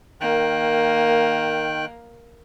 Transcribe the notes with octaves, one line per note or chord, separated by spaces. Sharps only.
D#3 A#3 G5 F#6